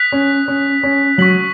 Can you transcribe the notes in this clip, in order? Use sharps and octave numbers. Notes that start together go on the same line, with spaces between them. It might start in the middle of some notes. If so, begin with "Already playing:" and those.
Already playing: D#6 F#6 B6
C#4
C#4
C#4
F#3 C#6 B6 F#7